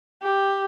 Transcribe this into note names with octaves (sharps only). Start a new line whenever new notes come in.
G4